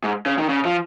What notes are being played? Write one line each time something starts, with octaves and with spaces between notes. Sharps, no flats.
G#2
C#3
D#3
C#3
F3